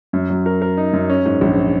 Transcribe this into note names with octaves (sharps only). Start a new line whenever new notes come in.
F#2
F#3
A#4
A#4
D#4
F#2
C#4
G#2
A#1